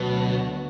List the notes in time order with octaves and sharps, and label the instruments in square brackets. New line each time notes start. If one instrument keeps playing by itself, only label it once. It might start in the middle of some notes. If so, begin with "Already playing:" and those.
Already playing: [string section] D2 D3 F#3 B3 F#4 [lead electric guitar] B2